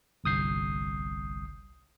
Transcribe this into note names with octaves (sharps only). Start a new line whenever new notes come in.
G1 C2 D#6 G6 C7